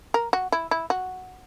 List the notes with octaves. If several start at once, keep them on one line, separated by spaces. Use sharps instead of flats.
A#4
F#4
E4
E4
F#4